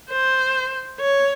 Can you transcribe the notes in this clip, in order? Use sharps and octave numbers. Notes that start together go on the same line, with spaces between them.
C5
C#5